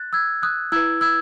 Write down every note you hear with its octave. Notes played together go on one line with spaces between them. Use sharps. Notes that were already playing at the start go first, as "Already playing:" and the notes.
Already playing: F#6 A6
E6 G#6
D#6 F#6
E4 B4 E6 G#6
E6 G#6